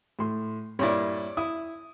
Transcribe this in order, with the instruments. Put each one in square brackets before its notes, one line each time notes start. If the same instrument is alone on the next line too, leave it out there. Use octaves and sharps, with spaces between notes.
[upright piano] A2 C6
[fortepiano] G2 A#2 E4 [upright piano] C#5 D5
[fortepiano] E4 [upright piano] D#6